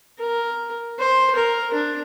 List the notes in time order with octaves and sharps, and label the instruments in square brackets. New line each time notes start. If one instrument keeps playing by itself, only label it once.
[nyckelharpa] A#4
C5
A#4
D4